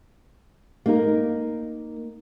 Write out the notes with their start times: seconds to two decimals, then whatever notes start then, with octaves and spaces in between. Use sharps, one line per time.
0.86 A#3 D#4 A#4